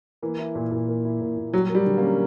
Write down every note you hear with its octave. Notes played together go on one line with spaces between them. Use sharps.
E3 A#3
E4
A#2
A#2
A#3
E4
A#2
A#2
F#3 G3
A#3
G3
D3
A#3 C#4